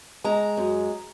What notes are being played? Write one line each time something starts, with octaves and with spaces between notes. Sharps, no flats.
G#3 A#5
F#2